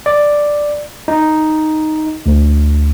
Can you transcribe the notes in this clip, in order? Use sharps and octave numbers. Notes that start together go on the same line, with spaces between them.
D5
D#4
D2